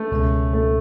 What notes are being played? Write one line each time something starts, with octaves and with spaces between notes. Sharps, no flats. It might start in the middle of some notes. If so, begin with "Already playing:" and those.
Already playing: A3
C#2 B2 G#3 C#4
A3